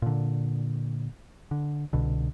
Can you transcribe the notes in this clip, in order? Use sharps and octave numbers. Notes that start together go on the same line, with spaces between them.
A#2 D3
D3
C2 B2 D3